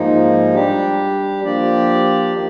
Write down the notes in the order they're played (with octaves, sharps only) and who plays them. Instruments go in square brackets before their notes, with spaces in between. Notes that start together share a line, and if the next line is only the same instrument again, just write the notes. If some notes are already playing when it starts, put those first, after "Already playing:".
Already playing: [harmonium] G#2 F3 A#3 D#4
G3 D4 G4
F3 A#3 D4 G4 D5
D#3 A#3